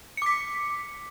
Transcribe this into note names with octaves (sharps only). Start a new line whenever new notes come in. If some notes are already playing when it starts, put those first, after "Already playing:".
D6 B6 C#7